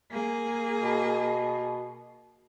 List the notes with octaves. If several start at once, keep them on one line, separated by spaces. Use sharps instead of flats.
A#3 G#4
B2